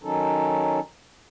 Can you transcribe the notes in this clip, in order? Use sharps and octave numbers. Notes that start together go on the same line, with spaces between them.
D#3 F#3 C#4 D#4 A4